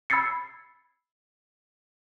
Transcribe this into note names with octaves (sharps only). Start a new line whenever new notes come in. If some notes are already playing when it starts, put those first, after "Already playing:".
B5 E6 G#6 A6 C7 C#7